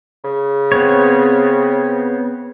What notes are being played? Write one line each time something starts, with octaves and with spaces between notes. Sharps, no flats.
C#3
B3 C4 C#5